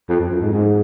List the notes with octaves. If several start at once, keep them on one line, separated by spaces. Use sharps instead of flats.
F2
F2
F#2
G#2
G#2